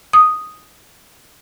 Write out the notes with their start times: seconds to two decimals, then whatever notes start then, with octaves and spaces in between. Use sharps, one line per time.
0.13 D#6